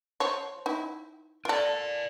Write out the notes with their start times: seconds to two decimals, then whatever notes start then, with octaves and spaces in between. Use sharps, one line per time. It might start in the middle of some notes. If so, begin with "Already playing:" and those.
0.20 F3 C#5
0.66 D#4 E4
1.45 F4 A4 A#4 D5